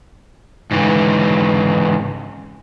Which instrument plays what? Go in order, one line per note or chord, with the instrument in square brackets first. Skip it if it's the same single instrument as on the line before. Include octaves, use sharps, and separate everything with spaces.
[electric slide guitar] G#2 C#3 E3